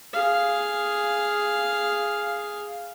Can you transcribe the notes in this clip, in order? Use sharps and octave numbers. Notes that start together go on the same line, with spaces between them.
G#4 F5